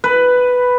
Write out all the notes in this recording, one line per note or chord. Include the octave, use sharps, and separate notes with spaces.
B4